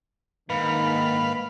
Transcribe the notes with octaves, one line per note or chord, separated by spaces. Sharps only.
G#2 D#3 A#3 B4 F5